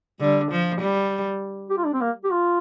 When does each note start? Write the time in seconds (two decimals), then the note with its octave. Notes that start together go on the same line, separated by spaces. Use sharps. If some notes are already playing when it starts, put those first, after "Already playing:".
0.20 D3 G3
0.51 F3
0.81 G3
1.70 G4
1.78 F4
1.86 D4
1.94 C4
2.01 A#3
2.24 G4
2.31 F4